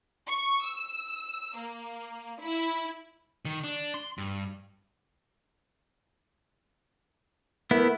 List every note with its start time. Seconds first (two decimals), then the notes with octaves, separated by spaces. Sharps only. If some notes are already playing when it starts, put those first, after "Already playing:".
0.28 C#6
0.64 E6
1.57 A#3
2.41 E4
3.45 D#3
3.64 D4
3.94 C6
4.18 G2
7.71 A3 B3 E4 A#4